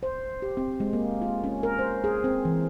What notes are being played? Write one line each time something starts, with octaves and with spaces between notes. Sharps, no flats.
C5
G4
C4
G#3
A#3
F4
C#4
A#4
C5
G#4
C4
E3